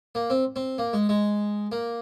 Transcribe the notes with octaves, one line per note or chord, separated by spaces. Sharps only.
A#3
C4
C4
A#3
G#3
G#3
A#3